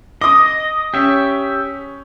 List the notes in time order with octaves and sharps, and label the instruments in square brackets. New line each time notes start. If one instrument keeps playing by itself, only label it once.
[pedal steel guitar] D#5 [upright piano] D6 D#6
[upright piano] C#4 [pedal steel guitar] G4 E5